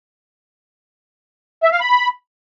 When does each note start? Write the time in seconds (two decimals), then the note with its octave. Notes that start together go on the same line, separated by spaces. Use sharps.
1.63 E5
1.72 F5
1.81 B5